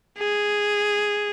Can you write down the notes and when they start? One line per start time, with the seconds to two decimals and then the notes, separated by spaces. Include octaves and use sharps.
0.19 G#4